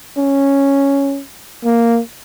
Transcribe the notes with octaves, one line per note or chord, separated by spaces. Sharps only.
C#4
A#3